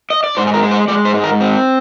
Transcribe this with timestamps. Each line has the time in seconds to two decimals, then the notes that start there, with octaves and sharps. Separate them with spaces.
0.10 D#5
0.24 D5
0.37 G#2 C5
0.47 G#4
0.54 A#4
0.63 G#3
0.71 C5
0.88 G#3 D5
1.05 C5
1.14 G#2
1.24 A#4
1.41 C4